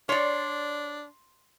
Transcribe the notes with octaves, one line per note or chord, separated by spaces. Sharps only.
D4 C#5 D5 C6